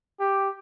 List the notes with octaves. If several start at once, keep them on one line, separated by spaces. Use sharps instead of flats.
G4